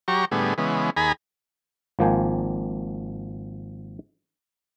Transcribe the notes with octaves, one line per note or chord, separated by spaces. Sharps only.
F#3 G4 A#5 C#6
A2 D3 G3 B3 G#4
C#3 E3 G#3 B3
D#2 G#4 G#5 A#5 B5
G#1 F3 A#3 G5 G#5